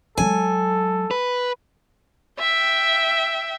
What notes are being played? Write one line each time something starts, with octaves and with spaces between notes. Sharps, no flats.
F#3 G#3 A4 G#5
B4
E5 G5